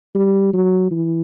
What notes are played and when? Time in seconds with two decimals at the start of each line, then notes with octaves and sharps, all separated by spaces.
0.15 G3
0.53 F#3
0.91 E3